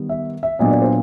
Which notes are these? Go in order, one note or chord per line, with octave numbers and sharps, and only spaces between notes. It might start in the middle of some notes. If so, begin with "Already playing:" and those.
Already playing: D#3 G3 B3
E5
E5
A#2 F#3 B3 D4 D#5
D5
C5